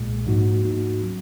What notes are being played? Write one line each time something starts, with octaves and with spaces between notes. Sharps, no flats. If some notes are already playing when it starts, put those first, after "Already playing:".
Already playing: B1 A#2 G#3
G#2 F3 A#3 D#4 F#4
G#2 F3 A#3 D#4 F#4
F#3 C#4 F4